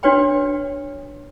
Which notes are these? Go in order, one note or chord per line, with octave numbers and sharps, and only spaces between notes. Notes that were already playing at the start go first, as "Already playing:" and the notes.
D4 F#4 B4 C#5 G5 B5